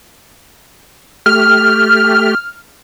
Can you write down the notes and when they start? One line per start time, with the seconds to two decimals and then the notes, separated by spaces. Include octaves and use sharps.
1.26 A3 G4 F6